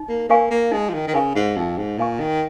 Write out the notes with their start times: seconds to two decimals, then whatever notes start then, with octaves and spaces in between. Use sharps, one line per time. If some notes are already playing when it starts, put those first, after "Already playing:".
Already playing: D#4
0.09 A#3
0.29 A#3 A#4 F5 G#5 C#6
0.51 A#3
0.71 G#3 D#4
0.89 F3
0.93 D#3
1.07 D#3
1.14 C#3 A#4 F5 G#5 C#6
1.35 G#2
1.56 F2 D#4
1.78 G#2
1.98 A#2 A#4 F5 G#5 C#6
2.20 D#3